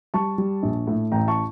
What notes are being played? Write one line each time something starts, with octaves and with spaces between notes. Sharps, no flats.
G3 A5 C#6
G3
A#1
A2
A1 G5 A#5
A5 C#6